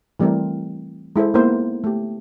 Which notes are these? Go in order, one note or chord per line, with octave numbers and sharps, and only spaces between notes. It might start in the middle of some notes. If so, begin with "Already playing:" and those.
E3 G3 A3 C4 A#4
G#3 E4 A4 C5
A#3 B3 D#4 E4 A#4 C5
A3 G4